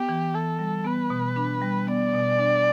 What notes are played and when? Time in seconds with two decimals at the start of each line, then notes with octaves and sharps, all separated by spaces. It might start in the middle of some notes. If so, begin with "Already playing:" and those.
Already playing: B3 G4
0.09 E3
0.34 E3 A4
0.59 G3
0.85 B3 B4
1.10 B2
1.36 D4
1.62 G3
1.87 B3 D5
2.14 B2
2.39 D4